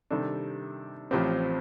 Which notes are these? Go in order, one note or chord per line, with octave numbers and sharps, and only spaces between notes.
C3 D#3 G3 D4 A4
A1 A2 F3 C4 G4